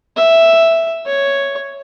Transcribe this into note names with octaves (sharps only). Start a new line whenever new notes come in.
E5
C#5